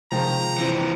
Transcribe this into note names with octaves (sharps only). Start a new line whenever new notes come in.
C3 D#3 F3 G#3 G5 A#5
E3 C4